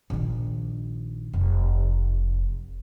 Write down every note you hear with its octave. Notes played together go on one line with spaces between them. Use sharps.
A#1 D#3
F1